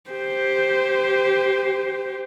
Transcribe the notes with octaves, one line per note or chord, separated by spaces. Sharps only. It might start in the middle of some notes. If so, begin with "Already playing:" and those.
G4 C5